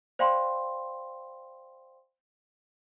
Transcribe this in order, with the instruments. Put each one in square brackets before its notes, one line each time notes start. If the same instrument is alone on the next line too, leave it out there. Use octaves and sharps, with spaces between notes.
[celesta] C5 D5 F5 G5 B5 C6